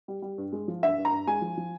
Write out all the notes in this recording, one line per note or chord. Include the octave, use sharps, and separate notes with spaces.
G3
G3
G2
G#3
F3
G2 E5
G2
A#5
G2
G#3 G#5
F3
F3